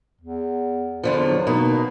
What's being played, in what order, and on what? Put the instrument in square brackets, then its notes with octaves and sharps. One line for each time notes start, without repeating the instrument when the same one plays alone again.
[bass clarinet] E2
[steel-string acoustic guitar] E2 D3 F3
[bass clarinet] F#3
[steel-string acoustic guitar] B2 A#3 [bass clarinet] D#4